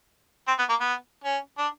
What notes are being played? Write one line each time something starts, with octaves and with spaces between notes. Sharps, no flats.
C4
B3
A#3
B3
C#4
D4